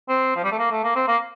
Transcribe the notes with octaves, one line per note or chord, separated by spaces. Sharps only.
C4
F3
G3
A3
A#3
A3
A#3
C4
A#3